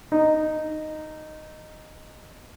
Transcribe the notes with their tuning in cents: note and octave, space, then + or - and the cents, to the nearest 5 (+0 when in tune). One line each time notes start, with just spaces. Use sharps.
D#4 -5